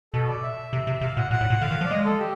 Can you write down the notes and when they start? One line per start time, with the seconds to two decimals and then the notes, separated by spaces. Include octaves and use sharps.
0.14 B2 A4
0.28 D5
0.43 E5
0.73 C3
0.87 C3
1.01 C3 F5
1.17 A#2 F#5
1.31 A#2 F#5
1.41 A2
1.50 A#2
1.61 D3 F5
1.71 D#3
1.81 F3
1.85 D5
1.90 G#3 D#5
2.05 A4
2.19 G4